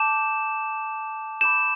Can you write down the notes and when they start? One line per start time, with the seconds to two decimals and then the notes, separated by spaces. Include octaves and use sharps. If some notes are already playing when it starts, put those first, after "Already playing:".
Already playing: A5 D6 G6 E7
1.41 B5 D6 G6 E7